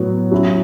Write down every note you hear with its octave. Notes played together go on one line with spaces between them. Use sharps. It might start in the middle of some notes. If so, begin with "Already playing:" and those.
Already playing: A2 F#3 B3 F#4
F#3 C#4 E4